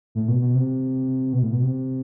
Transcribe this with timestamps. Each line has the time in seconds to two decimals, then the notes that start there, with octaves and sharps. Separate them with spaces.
0.15 A2
0.28 B2
0.41 B2
0.55 C3
1.33 B2
1.43 A2
1.53 B2
1.62 C3